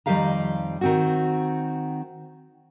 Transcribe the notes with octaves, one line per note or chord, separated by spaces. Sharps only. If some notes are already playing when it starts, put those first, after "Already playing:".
F2 D#3 G3 G4 F5 A#5
D#3 C4 F#4